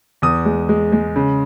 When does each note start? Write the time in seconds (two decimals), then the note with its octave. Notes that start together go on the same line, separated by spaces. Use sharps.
0.22 E2 D#6
0.45 G#3
0.69 G#3
0.92 G#3
1.16 C#3